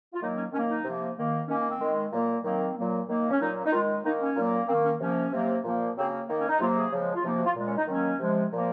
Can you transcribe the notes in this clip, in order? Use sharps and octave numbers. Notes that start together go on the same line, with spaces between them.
F4
D#3 F#3 A#3 D#4
C#4
D#3 F#3 A#3 C#4
D#4
C3 F3 A#3
D#3 A#3
D#3 A#3 C#4
C#4
C4
D#3 G#3
A#2 F#3 A#3
D#3 F#3 A#3 C4
A#2 F#3 A#3
D#3 F#3 A#3
C#4
A#2 F#3 A#3 D#4
D#4
D#3 G#3 F4
D#3 A#3 D#4
C#4
A#2 F#3 A#3
D#3 A#3 C4
C#4
C3 F3 A#3 C#4
C3 F#3 A#3
A#2 F3 A#3
C#3 F#3 A#3 C4
D#3 A#3
C#4
D#4
C3 F#3 A#3 F4
G#4
C#3 F3 G#3
F4
C3 F3 A#3 D#4
F#4
F4
A#2 G#3
C#4
D#4
D#3 F#3 A#3 C#4
C3 F3 G#3
A#2 F3 A#3